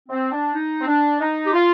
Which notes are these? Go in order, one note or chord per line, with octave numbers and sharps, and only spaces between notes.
C4
D4
D#4
C4
D4
D#4
G4
F4